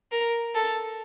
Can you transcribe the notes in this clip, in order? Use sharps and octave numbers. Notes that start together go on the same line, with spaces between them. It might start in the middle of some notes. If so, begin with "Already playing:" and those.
A#4
A4